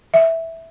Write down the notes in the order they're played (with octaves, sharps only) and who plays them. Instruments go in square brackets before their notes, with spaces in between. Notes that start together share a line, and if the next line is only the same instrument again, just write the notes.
[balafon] E5